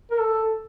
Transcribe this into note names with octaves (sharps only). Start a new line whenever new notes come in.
A#4
A4